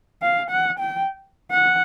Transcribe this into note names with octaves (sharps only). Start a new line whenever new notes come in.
F5
F#5
G5
F#5